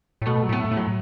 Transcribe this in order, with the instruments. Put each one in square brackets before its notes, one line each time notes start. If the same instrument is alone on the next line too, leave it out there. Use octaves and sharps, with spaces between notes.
[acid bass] A2
[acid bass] B2 [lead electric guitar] A3
[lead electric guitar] F#3
[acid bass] A2 [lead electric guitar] B3
[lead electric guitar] A3
[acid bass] A2
[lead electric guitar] F#3